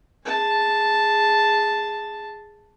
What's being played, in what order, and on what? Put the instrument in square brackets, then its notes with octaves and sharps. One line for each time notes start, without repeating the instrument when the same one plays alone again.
[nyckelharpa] G#4 A5